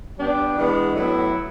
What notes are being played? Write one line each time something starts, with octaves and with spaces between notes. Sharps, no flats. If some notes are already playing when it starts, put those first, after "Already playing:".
G3 B3 D4 G4
E3 G#3 B3 D4
A2 F#3 B3 E4